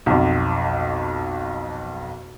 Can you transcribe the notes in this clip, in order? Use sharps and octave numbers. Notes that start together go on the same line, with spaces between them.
B1 F2